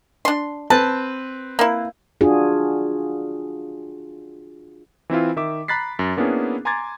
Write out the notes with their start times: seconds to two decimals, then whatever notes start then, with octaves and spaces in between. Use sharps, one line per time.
0.25 D4 C6
0.70 C4 B4 A5
1.59 A#3 E4
2.21 D4 F4 F#4 G#4
5.10 E3 C4 E4 F4
5.36 D#3 E5 D6
5.68 A#5 B5 F#6 A6 B6 C7
5.99 F#2
6.17 A#3 B3 C#4 D4 E4 G#4
6.65 G#5 A#5 C6 D6 G#6 A6